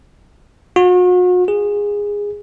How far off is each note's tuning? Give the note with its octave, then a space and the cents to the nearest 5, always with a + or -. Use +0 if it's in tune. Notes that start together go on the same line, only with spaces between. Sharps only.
F#4 -40
G#4 -15